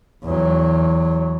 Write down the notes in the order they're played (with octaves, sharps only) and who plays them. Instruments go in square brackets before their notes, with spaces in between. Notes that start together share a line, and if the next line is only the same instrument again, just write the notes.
[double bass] E2 F#3